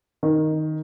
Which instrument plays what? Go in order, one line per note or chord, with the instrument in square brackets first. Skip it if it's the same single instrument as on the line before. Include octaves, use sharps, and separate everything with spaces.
[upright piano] D#3